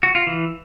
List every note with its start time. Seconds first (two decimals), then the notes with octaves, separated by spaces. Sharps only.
0.03 F#4
0.15 F4
0.27 E3